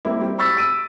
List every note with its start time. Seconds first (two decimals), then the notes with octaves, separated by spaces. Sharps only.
0.05 G3 A#3 C4 E4
0.21 C4 G4
0.38 B5 C#6 E6 A6 B6
0.57 E6 D7 D#7